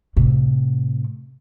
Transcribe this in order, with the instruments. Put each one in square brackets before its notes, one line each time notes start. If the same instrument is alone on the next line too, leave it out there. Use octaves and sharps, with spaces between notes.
[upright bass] A2 C3